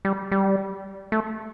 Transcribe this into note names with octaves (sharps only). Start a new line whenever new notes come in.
G3
G3
A3